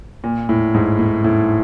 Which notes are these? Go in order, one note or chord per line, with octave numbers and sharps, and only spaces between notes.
A#2
A2
G#2
A2
A2